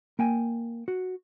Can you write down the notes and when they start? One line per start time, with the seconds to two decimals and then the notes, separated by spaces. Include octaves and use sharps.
0.19 A#3 G5 G#5
0.88 F#4